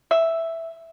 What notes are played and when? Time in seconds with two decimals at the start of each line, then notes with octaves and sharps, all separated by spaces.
0.11 E5